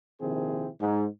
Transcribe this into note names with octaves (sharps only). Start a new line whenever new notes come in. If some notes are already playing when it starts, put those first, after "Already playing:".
A#1 C3 D#3 C4 E4 G#4
G#2